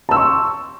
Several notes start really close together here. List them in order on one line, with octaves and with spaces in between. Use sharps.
A5 E6 C6 C#6